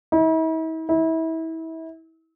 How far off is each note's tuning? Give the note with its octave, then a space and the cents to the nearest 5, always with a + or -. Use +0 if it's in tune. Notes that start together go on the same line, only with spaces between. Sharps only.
E4 -45
E4 -30